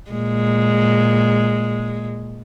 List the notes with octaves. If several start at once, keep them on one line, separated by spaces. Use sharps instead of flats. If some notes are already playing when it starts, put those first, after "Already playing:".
A#2 G#3